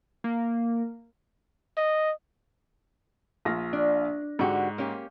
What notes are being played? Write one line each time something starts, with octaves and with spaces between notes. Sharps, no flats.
A#3
D#5
A#1 F4 A#6
D4
G#2 D3 F#4 G4
A#3 C#4 G4